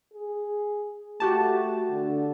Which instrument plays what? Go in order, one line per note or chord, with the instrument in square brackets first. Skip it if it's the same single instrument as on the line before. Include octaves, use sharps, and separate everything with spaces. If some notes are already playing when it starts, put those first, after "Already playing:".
[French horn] G#4
[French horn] A3 [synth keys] F#4 G4 A5
[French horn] D3